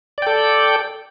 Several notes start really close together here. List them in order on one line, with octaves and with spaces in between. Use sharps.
D5 G5 A4